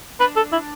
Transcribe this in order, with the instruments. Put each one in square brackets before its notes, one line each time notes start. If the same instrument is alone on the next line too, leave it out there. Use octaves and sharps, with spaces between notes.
[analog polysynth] D4 [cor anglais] B4
[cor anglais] A4
E4